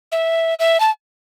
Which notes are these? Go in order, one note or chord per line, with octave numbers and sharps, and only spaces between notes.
E5
E5
A5